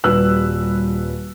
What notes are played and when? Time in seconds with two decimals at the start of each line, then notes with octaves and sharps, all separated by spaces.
0.04 D#1 G3 F#4 B4 E6 F#6